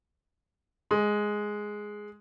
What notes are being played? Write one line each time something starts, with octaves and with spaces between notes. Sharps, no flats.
G#3